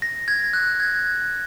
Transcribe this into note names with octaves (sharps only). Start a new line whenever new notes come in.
A#6
G#6
F#6
G#6